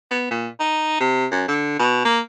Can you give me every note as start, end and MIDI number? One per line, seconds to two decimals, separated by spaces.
0.11 0.31 59
0.31 0.48 46
0.60 0.97 63
1.00 1.26 48
1.31 1.46 42
1.48 1.79 50
1.79 2.02 47
2.05 2.20 58